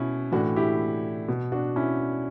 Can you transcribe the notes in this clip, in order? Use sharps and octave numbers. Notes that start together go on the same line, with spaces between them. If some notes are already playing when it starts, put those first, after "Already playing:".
Already playing: B2 C#4 E4
A2 E3 D4 F#4
E4 G4
B2
D4 F#4
C#4 E4